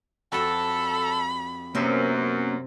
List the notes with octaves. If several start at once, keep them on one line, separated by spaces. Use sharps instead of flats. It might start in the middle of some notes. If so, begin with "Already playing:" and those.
F2 F#4 A4 A5 B5
F#2 C3 A#3 B3 C#4 D#5 E5